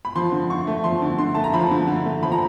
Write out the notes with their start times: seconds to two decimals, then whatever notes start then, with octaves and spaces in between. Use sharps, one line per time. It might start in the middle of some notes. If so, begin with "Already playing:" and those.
0.05 B5
0.15 F3 C6
0.32 D3
0.50 D3 C#6
0.67 A3
0.84 F3 C6
1.02 D3
1.19 D3 C6
1.35 A3 A5
1.44 A#5
1.53 F3 B5
1.71 D3
1.87 D3
2.06 A3
2.23 F3 B5
2.32 A#5